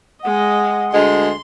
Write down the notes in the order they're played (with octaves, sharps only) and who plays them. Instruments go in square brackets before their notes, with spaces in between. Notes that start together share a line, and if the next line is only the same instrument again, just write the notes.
[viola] G#3 D#5 [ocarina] F#5
[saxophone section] D2 G#3 [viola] C6